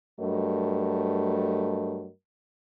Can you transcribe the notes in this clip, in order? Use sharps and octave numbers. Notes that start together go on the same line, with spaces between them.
G2 F#3 A3 A#4 D#5